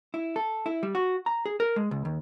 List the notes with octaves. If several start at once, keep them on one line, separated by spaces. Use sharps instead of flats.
E4
A4
E4
G3
F#4
A#5
G#4
A#4
G#3
C#2
D#2